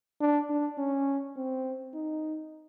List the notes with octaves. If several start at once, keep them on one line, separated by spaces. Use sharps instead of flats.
D4
D4
C#4
C4
D#4